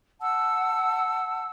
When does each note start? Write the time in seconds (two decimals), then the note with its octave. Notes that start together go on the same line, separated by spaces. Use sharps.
0.21 F#5 A5 E6